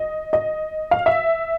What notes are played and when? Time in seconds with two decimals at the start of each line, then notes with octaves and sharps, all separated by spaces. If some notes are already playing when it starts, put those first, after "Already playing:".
Already playing: D#5
0.33 D#5
0.91 F5
1.06 E5